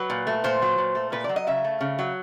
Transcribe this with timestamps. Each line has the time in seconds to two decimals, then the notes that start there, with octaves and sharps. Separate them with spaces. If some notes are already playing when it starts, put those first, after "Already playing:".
Already playing: F#3 B4
0.10 A#2
0.27 A3
0.44 A#2 C5
0.62 F#3
0.78 A#2
0.95 A3
1.12 A#2 B4
1.24 F#3 D5
1.36 D#5
1.47 C#3 E5
1.65 A3
1.81 C#3
1.99 F#3